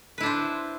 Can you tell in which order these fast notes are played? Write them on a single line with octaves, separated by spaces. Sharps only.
B4 E4 D4 C5